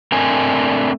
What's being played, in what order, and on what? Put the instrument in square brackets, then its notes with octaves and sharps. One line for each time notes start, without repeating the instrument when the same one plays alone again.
[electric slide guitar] A3 C4 D4 A#4 G#5